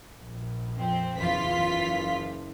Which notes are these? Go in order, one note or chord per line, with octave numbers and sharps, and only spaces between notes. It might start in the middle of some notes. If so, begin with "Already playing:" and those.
A#1
F2 C4
F#1 E2 E3 F4 B6
F#1